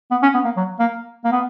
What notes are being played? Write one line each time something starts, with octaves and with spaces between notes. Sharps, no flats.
B3
C#4
B3
A#3
F#3
A#3
A#3
B3